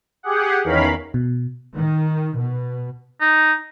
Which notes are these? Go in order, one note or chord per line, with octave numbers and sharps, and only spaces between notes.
G4 G#4 F#5
E2 D#3 C#4 A#4 F5 B5
B2
D#3
B2
D#4